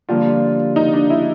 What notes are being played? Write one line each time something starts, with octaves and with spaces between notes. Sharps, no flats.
G2 D3 F3 A#3 F4
D#4
D4
E4